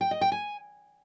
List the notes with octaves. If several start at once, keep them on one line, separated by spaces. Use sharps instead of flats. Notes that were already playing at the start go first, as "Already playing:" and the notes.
G5
D#5
G5
G#5